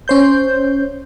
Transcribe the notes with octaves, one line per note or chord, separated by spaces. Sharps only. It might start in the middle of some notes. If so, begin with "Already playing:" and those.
C#4 C5 G6